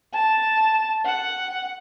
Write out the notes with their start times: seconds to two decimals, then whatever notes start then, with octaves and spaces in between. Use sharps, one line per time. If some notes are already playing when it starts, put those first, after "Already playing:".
0.14 A5
1.05 F#5